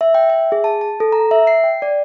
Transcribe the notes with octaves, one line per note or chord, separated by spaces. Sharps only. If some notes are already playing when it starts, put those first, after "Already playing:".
E5
G5
E5
G#4
A5
A5
A4
A#5
E5
C7
G5
D5